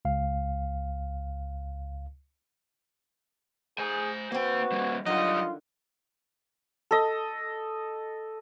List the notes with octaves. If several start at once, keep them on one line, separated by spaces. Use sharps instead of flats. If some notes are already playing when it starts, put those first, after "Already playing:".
C#2 F5
G#4 C5 G#5
A#3 C4 F#4 B4 G5
G3 A#3
D3 D#3 F#3 G3 F4 D#5 F#5
A4 D#5